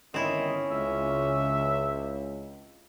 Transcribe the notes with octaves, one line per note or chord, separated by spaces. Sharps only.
G1 D#3 C4 C#4 E4 D#5
C#2 E5